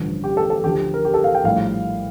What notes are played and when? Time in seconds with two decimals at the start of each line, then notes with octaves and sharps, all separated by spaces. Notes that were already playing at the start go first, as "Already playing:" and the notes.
Already playing: A1 G2 D3 F3
0.24 G4
0.37 A4
0.50 A4
0.64 D2 D3 F3 G4
0.94 A#4
1.05 G4
1.14 A4
1.24 F5
1.35 G5
1.44 A#1 A2 G3 F5